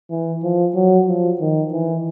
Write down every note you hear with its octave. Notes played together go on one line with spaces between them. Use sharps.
E3
F3
F#3
F3
D#3
E3